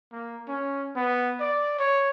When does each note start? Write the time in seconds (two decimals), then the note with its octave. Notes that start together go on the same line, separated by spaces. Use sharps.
0.12 A#3
0.48 C#4
0.96 B3
1.40 D5
1.79 C#5